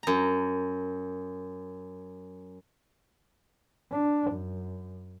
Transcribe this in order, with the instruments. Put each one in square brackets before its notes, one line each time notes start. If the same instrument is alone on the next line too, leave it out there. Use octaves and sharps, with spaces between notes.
[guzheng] F#2 A#5
[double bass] D4
F#2